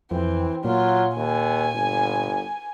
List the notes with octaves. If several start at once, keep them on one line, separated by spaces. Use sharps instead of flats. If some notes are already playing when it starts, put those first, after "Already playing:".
F2 E3 C4
A#2 F#3 F4
D#2 G#5
G1